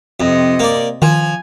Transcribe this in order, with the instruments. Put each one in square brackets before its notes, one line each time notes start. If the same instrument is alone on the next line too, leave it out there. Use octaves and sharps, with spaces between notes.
[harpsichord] F2 [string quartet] C3 D#5
[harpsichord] A#3 D5
[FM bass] D#3 [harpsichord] F3 [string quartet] G#5